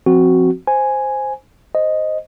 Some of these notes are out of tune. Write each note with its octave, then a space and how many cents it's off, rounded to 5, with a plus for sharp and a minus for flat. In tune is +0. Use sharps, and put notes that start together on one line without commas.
F3 +0 C4 +0 F#4 +0
C5 +0 G#5 +0
C5 -5 D#5 +0